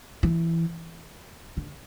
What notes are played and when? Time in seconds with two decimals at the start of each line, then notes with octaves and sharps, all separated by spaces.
0.23 E3
1.57 D3